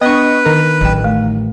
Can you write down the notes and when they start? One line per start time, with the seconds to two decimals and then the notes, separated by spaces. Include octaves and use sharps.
0.01 B3 D4 B4 D#5 C#6
0.46 D#3 A#4
0.81 A1 F#3 G5
1.04 A3